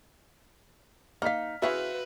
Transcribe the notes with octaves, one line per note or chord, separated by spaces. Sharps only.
A#3 D#4 B4 F5 F6 B6
C#3 E4 F#4 G#4 B4 C5 E5 F5